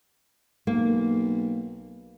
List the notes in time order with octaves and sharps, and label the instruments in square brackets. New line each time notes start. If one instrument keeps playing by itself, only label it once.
[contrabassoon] B1 [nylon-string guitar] A#3